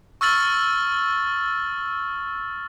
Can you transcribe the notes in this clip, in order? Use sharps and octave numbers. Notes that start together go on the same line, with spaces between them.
C#6 E6 F6 A6 F#7